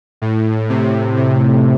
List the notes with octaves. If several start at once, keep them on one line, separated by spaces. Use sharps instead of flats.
A2
C3
C3